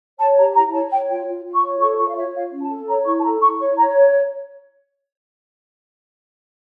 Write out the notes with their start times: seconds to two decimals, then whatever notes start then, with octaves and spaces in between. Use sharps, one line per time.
0.19 C#5 A5
0.38 G4 A#5
0.55 E4 A#5
0.73 C#5 A5
0.91 C#5 G5
1.09 F4 G5
1.27 F4
1.45 F4
1.54 C#6
1.63 C#5
1.81 A4 C#6
1.98 F4 C#6
2.08 F5
2.16 C#5 E5
2.35 F4 F5
2.52 C#4
2.62 A5
2.70 A4
2.87 C#5 A#5
3.05 E4 C#6
3.19 A5
3.23 A4 A#5
3.41 E4 C#6
3.59 C#5 C#6
3.77 C#5 A#5